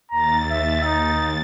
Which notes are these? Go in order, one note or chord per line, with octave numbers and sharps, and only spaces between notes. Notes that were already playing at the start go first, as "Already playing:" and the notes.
D#2 A#5 A6
E5
D#4